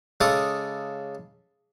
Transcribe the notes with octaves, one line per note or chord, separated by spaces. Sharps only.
C#3 G#3 A4 A5 D6 D#6